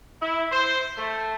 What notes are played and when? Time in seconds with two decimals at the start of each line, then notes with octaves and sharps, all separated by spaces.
0.20 E4
0.51 C5
0.97 A3